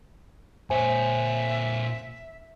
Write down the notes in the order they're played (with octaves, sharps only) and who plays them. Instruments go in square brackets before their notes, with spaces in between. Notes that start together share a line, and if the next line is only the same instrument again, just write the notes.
[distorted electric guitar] A#2 C#5 [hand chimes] C5 G#5 [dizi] E5